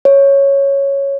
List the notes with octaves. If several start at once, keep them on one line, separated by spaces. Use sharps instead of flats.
C#5